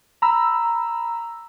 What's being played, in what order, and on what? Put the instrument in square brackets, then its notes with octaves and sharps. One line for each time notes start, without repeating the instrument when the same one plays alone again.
[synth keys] A#5 B5 E6